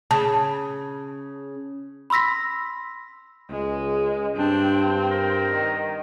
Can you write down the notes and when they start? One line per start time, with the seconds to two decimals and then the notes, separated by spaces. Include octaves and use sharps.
0.11 C#3 A5
2.10 B5 C6 E6 A#6 B6
3.50 C#2 G#3
4.37 G2 C4 D4
5.11 A#4
5.52 D#3